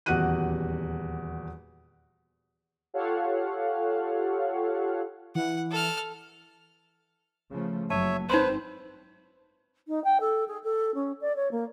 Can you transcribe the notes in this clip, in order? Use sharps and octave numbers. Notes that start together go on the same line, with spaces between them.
D#1 E2 F#4 G4 F#6 D#7
F4 G4 A4 C#5 F5 F#5
E3 F#5
A4 F6
C#3 F3 A3
F#1 F#3 C#5 E5 A5
G#1 C4 D#4 B4 C5 C6
D#4
G5
A4
G#4
A4
C#4
D5
C#5
A#3